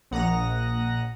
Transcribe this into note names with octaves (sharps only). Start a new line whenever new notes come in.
A#1 F#5 A#5 D#6 A#6